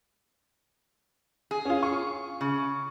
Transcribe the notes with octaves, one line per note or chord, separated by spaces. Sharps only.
G#4
C#4 F4
C#6
C#3